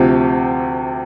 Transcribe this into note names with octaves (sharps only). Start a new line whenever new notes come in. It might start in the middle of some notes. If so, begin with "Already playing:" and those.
Already playing: D2 C3 F3 C4 G4